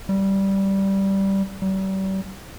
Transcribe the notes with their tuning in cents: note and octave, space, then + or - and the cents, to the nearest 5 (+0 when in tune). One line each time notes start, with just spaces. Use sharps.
G3 -10
G3 -40